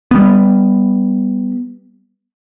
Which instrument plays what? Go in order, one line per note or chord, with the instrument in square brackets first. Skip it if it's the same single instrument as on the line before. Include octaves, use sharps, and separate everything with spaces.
[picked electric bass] G3 B3